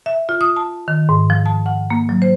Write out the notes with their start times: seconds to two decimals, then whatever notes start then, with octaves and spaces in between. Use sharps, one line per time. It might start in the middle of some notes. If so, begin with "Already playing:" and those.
0.06 E5
0.29 F4
0.41 D#6
0.56 A5
0.88 D#3
1.09 G#2
1.30 F3
1.46 A5
1.66 F#5
1.90 A#3
2.09 F#3
2.22 C5